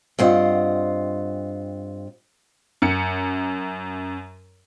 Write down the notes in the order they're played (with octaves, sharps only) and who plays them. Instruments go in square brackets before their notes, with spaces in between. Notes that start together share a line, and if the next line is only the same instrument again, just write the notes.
[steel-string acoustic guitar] G2 C4 F4 D#5 F#5
[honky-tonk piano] F#2 C#7